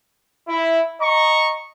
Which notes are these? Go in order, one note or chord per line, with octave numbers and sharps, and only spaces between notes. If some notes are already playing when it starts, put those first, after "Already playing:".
E4
D#5 A#5 C#6